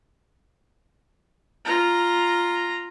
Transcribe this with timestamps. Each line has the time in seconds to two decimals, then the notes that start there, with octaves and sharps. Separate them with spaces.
1.65 F4 A#5